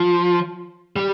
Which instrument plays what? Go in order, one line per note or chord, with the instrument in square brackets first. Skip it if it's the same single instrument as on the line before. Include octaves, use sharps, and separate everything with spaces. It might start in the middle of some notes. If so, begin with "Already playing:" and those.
Already playing: [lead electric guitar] F3
G3